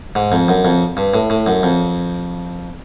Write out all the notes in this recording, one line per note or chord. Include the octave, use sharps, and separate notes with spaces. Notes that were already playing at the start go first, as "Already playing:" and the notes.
G#2
F2
F#2
F2
G2
A2
A2
F#2
F2